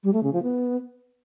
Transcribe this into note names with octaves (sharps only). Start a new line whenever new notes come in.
G3
A3
C#3
F3
B3